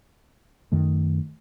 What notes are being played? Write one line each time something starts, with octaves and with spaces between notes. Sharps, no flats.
F#2 D#3 A3